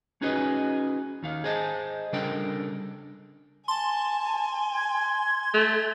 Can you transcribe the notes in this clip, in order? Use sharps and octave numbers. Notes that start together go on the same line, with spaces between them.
C#4 D#4 F#4 G#4 B4 D#5
D#2 D#3 F5
G#4 C5 D#5 G#5 A5
C#3 G3 D4 A4 A#4 G5
G#5 A5 C6
G#6
A3